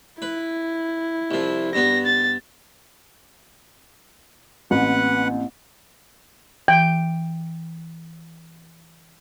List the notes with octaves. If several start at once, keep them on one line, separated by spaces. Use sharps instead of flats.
E4 B4
C2 F3
G2 B3 A#6
A6
A1 A#3 C4 B4 F#5 F#6
E3 G5